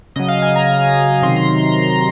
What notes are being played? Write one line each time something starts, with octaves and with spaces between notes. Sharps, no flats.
C#3 F#3 D#5
F5
G#5
A#5
C3 D#3 F#3 C6
A#5
C6
A#5
C6
A#5